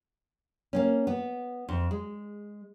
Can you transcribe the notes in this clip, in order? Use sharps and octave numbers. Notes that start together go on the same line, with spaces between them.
A#3 C4 C#4
B3
F2
G#3